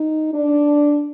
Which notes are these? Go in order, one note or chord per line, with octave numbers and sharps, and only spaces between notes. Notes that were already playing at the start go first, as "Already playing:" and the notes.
Already playing: D#4
D4